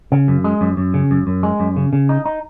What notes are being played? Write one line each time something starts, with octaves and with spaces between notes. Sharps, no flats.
C#3
F#2
G#3
F#2
F#2
C#3
F#2
F#2
G#3
F#2
C#3
C#3
D#4
D#4